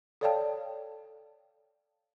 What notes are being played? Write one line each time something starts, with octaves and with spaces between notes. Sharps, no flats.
A4 C#5 D5 F5 G5 A5